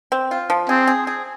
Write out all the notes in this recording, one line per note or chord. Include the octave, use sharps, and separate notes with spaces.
C4
F4
F3
C4 G#4
G#4
G#4